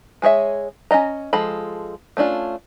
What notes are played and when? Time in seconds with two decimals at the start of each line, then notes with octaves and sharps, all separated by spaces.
0.22 G#3 G#4 C#5 E5
0.91 C#4 D#4 D#5 A#5
1.33 F3 G#3 A4 B5
2.17 A3 C#4 D4 F4